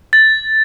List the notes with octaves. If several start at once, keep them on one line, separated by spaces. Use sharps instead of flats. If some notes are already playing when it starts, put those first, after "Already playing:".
A6